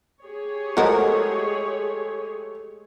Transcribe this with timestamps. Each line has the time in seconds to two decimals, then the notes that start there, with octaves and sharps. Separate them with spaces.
0.23 G4 G#4 C#5
0.77 F3 G#3 A3 F#4 A#4